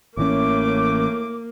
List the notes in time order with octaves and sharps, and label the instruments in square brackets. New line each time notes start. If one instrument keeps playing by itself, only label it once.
[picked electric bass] A1 E3 C#4 [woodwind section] A2 A3 D6 [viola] A#3